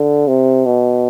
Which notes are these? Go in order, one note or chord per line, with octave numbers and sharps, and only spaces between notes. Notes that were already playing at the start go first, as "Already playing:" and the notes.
Already playing: D3
C3
B2